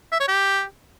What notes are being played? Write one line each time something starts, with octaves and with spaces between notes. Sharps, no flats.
E5
C#5
G4